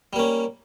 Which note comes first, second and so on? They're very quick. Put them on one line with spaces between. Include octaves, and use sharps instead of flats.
G3 A#3 C#4